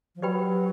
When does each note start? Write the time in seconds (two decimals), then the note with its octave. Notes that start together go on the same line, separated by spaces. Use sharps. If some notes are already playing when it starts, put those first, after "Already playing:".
0.16 F3
0.22 F#3 G4 B4 D5 G5 B5